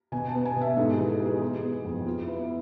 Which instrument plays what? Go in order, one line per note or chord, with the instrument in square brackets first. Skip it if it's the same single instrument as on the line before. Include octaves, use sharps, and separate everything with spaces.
[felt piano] B2 G#5
A5
B3
G#5
B2
E5
G#2 A4
G#4
E3
G#4
B3
G#4
B3
B3
F2
B3 F4
E4
B3
E4